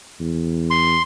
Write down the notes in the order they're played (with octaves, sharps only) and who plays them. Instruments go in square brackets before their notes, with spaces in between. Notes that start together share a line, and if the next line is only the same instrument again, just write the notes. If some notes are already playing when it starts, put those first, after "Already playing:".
[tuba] E2
[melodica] C6